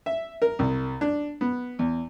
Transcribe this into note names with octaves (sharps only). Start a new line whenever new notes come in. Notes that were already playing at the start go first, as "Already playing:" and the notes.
E5
A#4
C2
D4
B3
E2